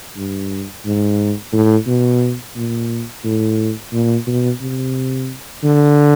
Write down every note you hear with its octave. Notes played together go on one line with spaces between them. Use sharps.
G2
G#2
A2
B2
A#2
A2
A#2
B2
C3
D3